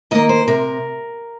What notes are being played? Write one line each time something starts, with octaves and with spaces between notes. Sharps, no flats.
D#3 A#3 D#5
C5
C3 A#4